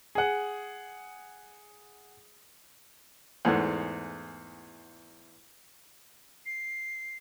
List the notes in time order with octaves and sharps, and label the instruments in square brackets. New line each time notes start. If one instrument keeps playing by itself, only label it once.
[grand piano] G#4 F#5
[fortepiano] E2 G#2 A3 F#5
[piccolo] C7